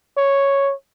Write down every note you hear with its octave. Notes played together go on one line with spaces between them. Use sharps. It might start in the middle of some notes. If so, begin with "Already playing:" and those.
C#5